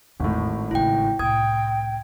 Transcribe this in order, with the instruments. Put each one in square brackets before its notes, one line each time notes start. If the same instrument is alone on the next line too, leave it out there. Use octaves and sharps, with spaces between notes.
[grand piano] G#1 A2 [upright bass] E2 D3
[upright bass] A1 C#3 [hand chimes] E4 G5
[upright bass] C2 A2 [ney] G5 [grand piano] D#6 [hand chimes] G#6